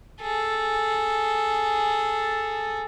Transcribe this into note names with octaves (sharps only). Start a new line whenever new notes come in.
G#4 A4